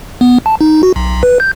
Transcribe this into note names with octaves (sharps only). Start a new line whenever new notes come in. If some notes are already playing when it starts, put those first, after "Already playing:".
B3
A5
D#4
F#4
B1
B4
G6